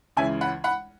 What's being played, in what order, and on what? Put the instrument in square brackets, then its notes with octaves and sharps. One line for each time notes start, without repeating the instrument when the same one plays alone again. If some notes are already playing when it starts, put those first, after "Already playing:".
[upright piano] C#2 C#3 E3 E5 G#5
F#5 B5
F#5 B5